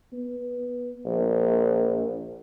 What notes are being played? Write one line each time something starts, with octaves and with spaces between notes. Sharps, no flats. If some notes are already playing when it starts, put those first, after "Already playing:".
B3
A#1